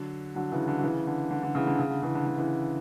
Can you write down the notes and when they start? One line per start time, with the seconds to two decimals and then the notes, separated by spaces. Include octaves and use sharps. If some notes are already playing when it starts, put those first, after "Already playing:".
Already playing: D3 F#3
0.35 D3 F#3
0.52 C#3 E3
0.68 D3
0.79 F#3
0.83 C#3 E3
1.07 D3
1.31 D3
1.43 D3
1.55 C#3 E3
1.67 D3
1.79 C#3
1.91 D3
2.03 C#3 E3
2.15 D3
2.26 D3
2.38 C#3 E3